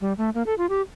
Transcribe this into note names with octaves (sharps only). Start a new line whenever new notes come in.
G3
A3
A#3
A4
F4
G4